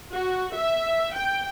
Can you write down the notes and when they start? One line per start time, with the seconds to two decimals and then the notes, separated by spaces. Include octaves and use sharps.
0.12 F#4
0.54 E5
1.15 G5